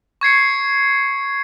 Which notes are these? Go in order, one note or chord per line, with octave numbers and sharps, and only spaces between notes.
C#6 G#6 C7 C#7